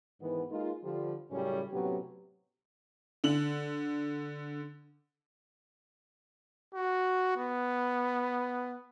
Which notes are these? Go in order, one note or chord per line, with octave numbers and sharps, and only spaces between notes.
G#2 D#3 E3 B3
G#3 A#3 D#4 F4
D3 F3 G3
F#2 A2 C#3 G3 C#4
A2 C3 F#3 B3 C#4 G4
D3 F#7
F#4
B3